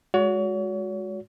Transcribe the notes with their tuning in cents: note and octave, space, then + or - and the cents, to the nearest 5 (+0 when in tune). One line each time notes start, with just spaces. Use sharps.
G#3 +0 F#4 -15 C#5 +40